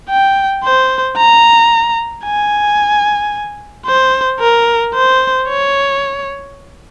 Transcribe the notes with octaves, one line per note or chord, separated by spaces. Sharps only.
G5
C5
A#5
G#5
C5
A#4
C5
C#5